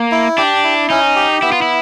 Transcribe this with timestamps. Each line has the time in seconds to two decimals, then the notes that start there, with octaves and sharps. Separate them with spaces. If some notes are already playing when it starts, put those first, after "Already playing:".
Already playing: A#3
0.12 E4
0.38 D4 G4
0.64 E4
0.90 C#4 D#4
1.16 G4
1.42 B3 E4
1.52 F4
1.62 E4